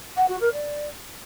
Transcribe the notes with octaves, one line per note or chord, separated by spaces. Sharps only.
F#5
F#4
A#4
D5